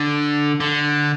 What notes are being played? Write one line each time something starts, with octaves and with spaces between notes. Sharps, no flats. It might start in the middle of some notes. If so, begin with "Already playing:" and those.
Already playing: D3
D3